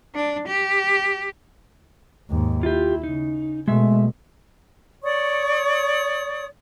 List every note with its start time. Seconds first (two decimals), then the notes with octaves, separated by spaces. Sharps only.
0.15 D4
0.48 G4
2.30 D#2 G#2
2.63 E4 F4 G4
3.04 C#3 D#4
3.68 B2 G#3 A3 E5
5.03 C#5 D5 C#6 D#6